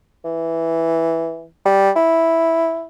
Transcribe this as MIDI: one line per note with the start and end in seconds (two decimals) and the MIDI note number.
0.25 1.46 52
1.66 1.90 55
1.96 2.87 64